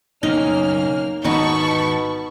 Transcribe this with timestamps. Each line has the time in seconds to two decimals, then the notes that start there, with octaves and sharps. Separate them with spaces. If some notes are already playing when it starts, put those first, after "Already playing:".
0.23 F#1 B1 F2 A#3 C#4 D#4 F6
1.24 G#1 E2 B2 B3 D#4 A5 B5 C#6